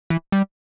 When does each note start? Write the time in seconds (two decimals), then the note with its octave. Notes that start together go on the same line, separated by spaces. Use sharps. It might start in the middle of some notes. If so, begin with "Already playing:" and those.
0.10 E3
0.32 G3